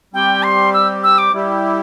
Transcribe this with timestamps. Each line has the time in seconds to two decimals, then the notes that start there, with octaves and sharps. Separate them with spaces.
0.14 G3 C4 G4 G5
0.43 C6
0.74 E6
1.04 E6
1.18 D6
1.33 G3 E4 G4